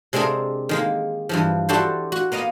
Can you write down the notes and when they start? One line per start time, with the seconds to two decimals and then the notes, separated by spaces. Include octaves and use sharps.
0.13 C3 G#3 C4 D4 G#4 A#4
0.69 D#3 G#3 A#3
1.29 G2 E3 F3
1.69 D4 E4 F#4 G4 A4 C5
2.12 F#4
2.32 A#3 B3 D#5 F5